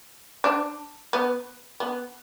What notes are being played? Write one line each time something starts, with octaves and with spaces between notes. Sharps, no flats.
D4
B3
B3